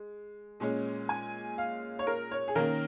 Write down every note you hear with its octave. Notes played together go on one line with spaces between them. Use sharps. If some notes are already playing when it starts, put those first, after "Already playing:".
Already playing: G#3
A#2 G#3 C#4
G#5
F5
C#5
A#4
C#5
G#4
D#3 A#3 C#4 A#4